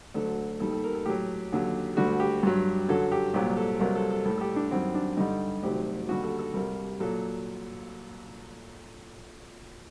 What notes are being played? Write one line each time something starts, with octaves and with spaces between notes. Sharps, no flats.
D2 D3 F#3 A4
D#2 D#3 G3 A4
A4
A#4
A4
A2 F#3 G4
D#2 D3 F#3
D2 D3 G3 F#4
G4
G2 F#3
F#2 D3 F#3 A4
G4
C2 A#2 F#3 G4
A4
C2 C3 F#3 A#4
A4
A4
A2 G3 A4
A4
G4
D4
F#2 D#3 G3 C4
D4
G2 D3 G3 D#4
D2 C3 D#3 F#3 G4
D#2 D3 G3 F#4
A4
A4
C2 C3 G3 A#4
A#2 F#3 A4